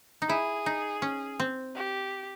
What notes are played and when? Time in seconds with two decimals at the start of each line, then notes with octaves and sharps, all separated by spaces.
0.22 D#4
0.29 E4 G#4
0.66 D#4
1.02 C#4
1.40 C4
1.76 G4